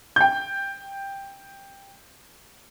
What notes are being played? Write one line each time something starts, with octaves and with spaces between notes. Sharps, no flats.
G5 G6